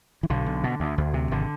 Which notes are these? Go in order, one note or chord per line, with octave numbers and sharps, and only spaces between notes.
E3
B1 D3
B1
B2
D2
D2
C3
G#1 D3